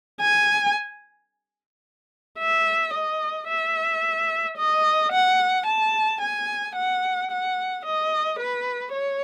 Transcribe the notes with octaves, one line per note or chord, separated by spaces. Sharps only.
G#5
E5
D#5
E5
D#5
F#5
A5
G#5
F#5
F#5
D#5
B4
C#5